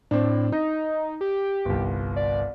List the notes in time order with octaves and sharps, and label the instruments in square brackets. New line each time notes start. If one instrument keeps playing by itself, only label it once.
[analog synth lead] A2 [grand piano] C4 D4
[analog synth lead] D#4 [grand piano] D#5
[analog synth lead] G4
[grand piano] G1 C2
[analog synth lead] D5